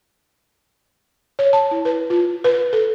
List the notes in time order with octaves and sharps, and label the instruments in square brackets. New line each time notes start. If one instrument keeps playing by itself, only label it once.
[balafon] C#5
A5
E4
B4
F4
B4
A4